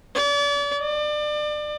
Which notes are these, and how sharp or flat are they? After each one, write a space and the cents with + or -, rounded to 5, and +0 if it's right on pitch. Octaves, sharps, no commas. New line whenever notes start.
D5 -40
D5 +30